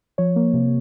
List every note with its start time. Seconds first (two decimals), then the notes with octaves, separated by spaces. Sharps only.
0.18 F3 C#5
0.36 A#3
0.54 C3